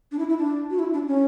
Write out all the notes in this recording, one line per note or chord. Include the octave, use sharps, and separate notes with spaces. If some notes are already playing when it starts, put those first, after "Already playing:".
D4
E4
E4
D4
F#4
E4
D4
C#4